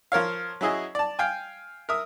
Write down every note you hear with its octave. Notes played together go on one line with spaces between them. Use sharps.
F3 A#4 C#5 F5
F#3 C#4 E4 G#4 D#5
D5 A5
F5 G5 G#5
A#4 E5 D#6